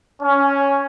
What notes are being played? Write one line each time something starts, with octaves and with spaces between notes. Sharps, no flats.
C#4